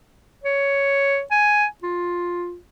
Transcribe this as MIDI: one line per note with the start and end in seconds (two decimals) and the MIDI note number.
0.44 1.22 73
1.31 1.66 80
1.83 2.58 65